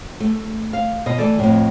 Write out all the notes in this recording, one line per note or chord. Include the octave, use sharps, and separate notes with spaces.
A3
F5
B2 F4 D#5
E3 A3 A4 D5
F2 A2